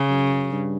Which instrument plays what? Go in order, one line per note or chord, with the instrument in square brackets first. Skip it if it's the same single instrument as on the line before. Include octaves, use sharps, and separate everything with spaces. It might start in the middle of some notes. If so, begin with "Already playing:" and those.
Already playing: [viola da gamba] C#3
[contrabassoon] F#2
G2